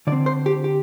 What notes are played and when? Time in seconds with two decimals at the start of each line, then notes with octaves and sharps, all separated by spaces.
0.07 D3 D5
0.12 C4
0.26 C5
0.46 G4
0.64 G4